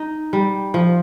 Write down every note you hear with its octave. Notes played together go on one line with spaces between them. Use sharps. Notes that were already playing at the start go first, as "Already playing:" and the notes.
Already playing: D#4
G3
F3